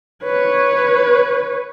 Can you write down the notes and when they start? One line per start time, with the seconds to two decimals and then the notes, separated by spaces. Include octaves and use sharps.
0.23 B4 C#5